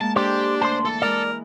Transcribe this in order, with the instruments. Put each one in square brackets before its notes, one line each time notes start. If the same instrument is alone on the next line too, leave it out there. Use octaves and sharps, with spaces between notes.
[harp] G#3 A#3 [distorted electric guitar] A5
[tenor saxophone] D4 [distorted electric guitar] G4 [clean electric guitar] A4 C5
[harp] D2 [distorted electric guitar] C5 [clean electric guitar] A5 C6
[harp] E3 [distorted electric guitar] A4
[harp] G#3 E4 [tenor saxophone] A#4 [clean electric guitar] D5